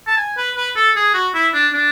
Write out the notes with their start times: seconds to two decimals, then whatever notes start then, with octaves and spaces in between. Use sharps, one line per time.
0.07 A5
0.17 G#5
0.37 B4
0.56 B4
0.76 A4
0.96 G#4
1.14 F#4
1.34 E4
1.54 D4
1.73 D4